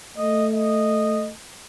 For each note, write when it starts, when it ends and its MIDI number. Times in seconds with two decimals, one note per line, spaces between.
0.17 1.32 57
0.17 0.46 75
0.54 1.29 75